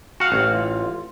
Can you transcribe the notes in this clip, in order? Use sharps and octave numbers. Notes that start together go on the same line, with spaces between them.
F#4 F5 F#5
A1
F4